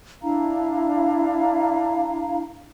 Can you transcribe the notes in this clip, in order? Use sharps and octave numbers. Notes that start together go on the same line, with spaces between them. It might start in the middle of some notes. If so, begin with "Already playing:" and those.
D4 E4 F5 A#5